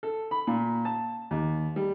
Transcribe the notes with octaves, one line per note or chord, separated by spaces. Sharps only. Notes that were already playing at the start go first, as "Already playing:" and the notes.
A4
B5
A#2
A5
D#2
G3